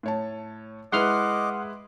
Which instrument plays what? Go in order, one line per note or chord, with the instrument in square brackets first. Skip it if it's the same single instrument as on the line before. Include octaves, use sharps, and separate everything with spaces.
[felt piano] A2 C#5 A5
[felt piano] G#3 E4 B4 [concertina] D#5 D6 [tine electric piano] F#5 C6 F6